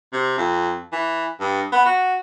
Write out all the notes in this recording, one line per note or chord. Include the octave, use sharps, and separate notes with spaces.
C3
F2
E3
G2
B3
F#4